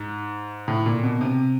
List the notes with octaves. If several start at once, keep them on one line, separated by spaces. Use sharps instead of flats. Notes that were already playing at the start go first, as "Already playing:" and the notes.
Already playing: G#2
A2
A#2
B2
C3